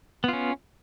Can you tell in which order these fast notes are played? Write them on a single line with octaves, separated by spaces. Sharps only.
B3 F4 C#4